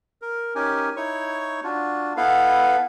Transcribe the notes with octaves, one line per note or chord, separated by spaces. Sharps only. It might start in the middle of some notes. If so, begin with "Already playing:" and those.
A#4
C#4 D#4 G4 A#4 G#5
D#4 E4 C#5 C#6
D4 F4 F#4
B3 E4 A4 B4 F5